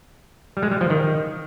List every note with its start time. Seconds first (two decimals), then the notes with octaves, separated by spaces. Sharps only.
0.57 G3
0.63 G#3
0.71 G3
0.81 F3
0.90 D#3